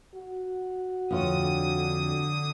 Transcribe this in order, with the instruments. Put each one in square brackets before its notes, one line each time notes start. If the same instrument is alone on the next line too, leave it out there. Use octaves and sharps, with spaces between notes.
[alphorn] F#4
[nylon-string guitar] F2 F4 C#5 [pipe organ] D3 D#6